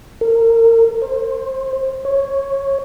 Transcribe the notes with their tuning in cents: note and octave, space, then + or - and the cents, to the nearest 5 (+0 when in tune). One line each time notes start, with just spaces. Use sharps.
A#4 -30
C5 +25
C#5 -15